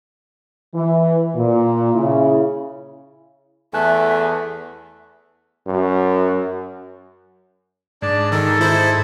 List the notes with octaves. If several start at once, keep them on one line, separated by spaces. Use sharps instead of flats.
E3
A#2
C#3 E4
E2 A3 E5 G#5 F#6
F#2
G#2 D4 D5 A5
D#3 D#4 A4
E4 C5